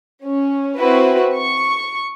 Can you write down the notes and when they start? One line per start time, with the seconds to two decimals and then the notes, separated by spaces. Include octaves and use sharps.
0.23 C#4
0.77 C4 E4 F#4 B4
1.36 C#6